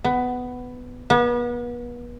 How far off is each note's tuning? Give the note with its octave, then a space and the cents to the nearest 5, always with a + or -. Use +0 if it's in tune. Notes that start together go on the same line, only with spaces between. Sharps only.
B3 +10
B3 -35